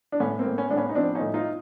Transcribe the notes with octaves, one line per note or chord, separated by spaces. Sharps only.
D4
A2 B3 C#4
A#3 C4
A2
B3 C#4
A2 D4
B3 C#4
D#4
F3 C4 D4
C#4 D#4
A2
D#4 F4